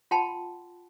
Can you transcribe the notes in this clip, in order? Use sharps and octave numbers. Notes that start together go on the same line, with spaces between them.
F4 F#5 G5 A5 B5 C6